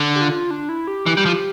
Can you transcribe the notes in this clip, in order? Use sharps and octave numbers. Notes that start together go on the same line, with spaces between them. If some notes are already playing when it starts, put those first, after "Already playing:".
Already playing: D3
G4
F4
D4
E4
G4
E3
G3
F3